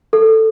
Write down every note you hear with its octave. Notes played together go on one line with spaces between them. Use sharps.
A4